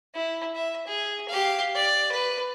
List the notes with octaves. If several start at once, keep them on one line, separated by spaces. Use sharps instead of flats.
E4
E5
G#4
G4 F5
D5
B4